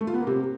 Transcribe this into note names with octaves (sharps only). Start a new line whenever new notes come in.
A3
F4
B3
A#3
C3